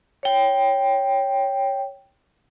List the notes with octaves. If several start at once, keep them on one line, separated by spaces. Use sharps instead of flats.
C#5 G5